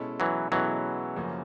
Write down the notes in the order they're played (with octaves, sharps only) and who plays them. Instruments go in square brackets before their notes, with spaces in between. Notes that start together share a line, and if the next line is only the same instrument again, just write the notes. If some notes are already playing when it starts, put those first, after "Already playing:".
Already playing: [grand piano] B2 G#3 C#4 E4 A4
[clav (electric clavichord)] E3 F#3
[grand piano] B2 G#3 C#4 E4 A4 [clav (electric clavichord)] E3 F#3
[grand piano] F#2 C#3 F3 A#3 C#4